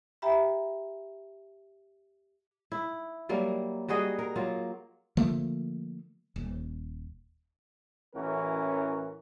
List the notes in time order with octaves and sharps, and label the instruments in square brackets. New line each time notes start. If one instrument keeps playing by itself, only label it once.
[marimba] G4 E5 G5 A#5 B5
[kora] E4
F#3 G3 A#3
G3 F#4 G#4 D#5
A#4
F#3 A#3 F4
[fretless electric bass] D3 F3 A3 A#3
D#1
[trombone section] A1 E3 C#4 F#4 A#4